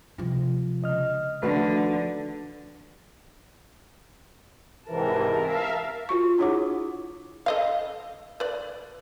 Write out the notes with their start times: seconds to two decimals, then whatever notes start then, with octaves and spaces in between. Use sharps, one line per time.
0.18 C3 F3
0.82 C#2 D#5 F6
1.43 D3 D#3 F3 A3 F#4 B4
4.88 G#2 C3 E3 A#4 A5
5.41 E5 F5
6.09 F4 F#4 C#6
6.38 D4 E4 G#4 C#5 F#5 D6
7.46 A4 D#5 F5
8.40 B4 D5